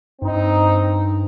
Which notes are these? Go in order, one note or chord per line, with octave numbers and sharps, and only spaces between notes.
G2 C4 D#4